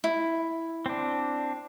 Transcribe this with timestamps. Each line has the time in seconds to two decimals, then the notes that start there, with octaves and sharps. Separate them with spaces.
0.04 E4
0.86 C4 D4